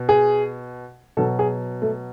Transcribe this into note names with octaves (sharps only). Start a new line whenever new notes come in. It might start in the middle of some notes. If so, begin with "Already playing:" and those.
Already playing: B2
G#4
B2 F#3 A4
G#4
A3